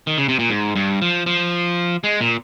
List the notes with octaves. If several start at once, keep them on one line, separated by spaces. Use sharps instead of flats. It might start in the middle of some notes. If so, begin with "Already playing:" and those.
D#3
C#3
C3
A#2
G#2
G2
F3
F3
G#3
A#2